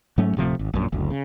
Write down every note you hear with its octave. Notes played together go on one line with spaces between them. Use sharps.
G#2 F#3 A3 C#4
D1 C3 F3 A3
G#1
A#1 F#2 A#2
F#1 D2
C#3